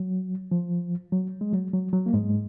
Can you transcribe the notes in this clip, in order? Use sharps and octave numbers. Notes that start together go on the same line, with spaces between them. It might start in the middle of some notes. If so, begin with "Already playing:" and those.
Already playing: F#3
F3
F#3
G#3
F#3
F#3
F#3
A#3
G#2 G#3